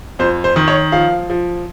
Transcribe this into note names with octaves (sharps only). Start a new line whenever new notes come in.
F2 C5
C5
D#3
C#5
F3 F5
F3